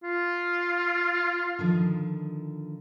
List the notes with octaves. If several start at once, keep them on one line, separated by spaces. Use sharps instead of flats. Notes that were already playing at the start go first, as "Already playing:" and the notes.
F4
D3 D#3 F3